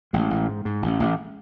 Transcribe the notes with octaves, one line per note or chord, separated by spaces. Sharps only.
A1 G#3
A1
G#2
G#2
A1
A1